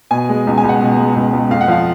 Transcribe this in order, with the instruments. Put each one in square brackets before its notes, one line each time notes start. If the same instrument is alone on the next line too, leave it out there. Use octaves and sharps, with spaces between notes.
[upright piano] B2 G#5
G#3
C#2
G#5
C#2
F#5
B2
G#3
C#2
C#2
F2 F5
F#5
F3 F5